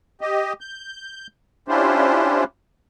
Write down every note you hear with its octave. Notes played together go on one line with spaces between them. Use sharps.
G4 D#5
G6
C#4 D4 E4 F4 G4 C5